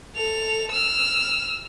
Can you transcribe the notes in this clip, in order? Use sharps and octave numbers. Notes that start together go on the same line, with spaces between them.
A4 F7
E6 F6